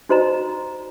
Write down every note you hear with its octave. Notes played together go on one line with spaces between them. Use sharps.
D#4 F#4 C5 D5 D#5 A#5